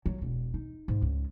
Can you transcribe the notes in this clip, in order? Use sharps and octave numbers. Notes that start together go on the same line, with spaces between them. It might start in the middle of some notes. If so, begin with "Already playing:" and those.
F#3
E1
D#4
G#2
C#2